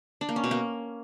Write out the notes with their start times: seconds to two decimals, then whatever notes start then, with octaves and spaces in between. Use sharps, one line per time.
0.21 D4
0.29 A#3
0.36 C#4
0.44 B2
0.51 A#3